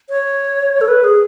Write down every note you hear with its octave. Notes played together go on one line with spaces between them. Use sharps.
C#5
A4
B4
G#4